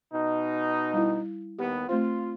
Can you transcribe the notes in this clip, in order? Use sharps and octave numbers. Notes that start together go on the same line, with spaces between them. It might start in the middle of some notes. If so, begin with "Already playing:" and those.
B2 D#4
G3 E4
D#2 B3 G4
A3 C4 F4 C5